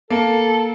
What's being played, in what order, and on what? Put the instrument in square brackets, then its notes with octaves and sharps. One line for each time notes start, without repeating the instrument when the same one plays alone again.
[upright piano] A#3 [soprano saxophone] A4